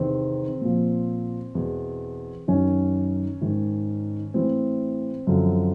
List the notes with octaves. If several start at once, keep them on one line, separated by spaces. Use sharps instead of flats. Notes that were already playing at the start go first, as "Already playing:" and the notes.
Already playing: E2 C3 D#3 C4
A#2 F3
E2 B2
F#2 D#3 C#4
G#2 D#3
A2 E3 C4
F#2 D3 F3